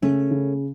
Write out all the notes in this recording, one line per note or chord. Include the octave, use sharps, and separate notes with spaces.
C#3 A3 C#4
C#3